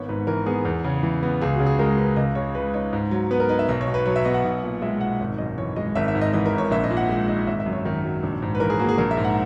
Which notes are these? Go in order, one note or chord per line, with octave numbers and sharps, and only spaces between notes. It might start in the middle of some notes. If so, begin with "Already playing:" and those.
Already playing: G#1 B3 C#5
G#2 B4
E3 A#4
B3 G#4
E2
C#3
E3
B3
C#2 G#4
F#4
C#3
G#4
G#3 A#4
C#4 B4
C#2 D#5
C#3 C#5
G#3 B4
D#4 C#5
G#2
F#3
B3 B4
A#4
D#4 B4
E5
B1 D#5
C#5
B2
B4
F#3 C#5
E5
B3 D#5
F#5
B1
A#2
G#3 E5
B1 F#5
G#1
F#2 D#5
E3 C#5
G#3 D#5
G#1 E5
E5
G#2
D#5
E3 D#5
A#4
G#1
C#5
A#1 E5
D#5
A#2
F#5
G#3
D#4 D#5
G#1 E5
E5
F#2
C#5
D#3
F#3
A#1
G#2
B4
E3 A#4
G#4
A#3 F#4
G#4
A#1 A#4
E5
G#2
F#5